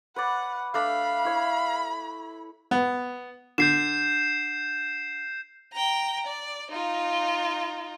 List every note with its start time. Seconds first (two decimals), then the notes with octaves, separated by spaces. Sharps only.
0.16 B4 C#5 D5 F#5
0.74 A3 D4 F5 B5
1.25 E4 C#5
2.71 B3
3.58 D3 G6 C7 E7
5.73 G5 A#5
6.27 D5
6.71 D#4 F4